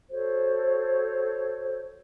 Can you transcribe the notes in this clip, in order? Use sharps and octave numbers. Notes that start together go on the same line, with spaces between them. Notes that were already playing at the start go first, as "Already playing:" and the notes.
F#4 A4 C5 C#5